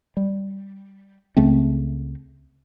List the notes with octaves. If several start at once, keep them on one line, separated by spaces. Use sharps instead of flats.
G3
C#2 C#3 A3 C4